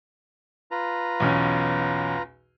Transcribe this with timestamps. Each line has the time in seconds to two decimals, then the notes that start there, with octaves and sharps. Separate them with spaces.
0.71 F4 B4 A#5
1.20 B1 E2 C#4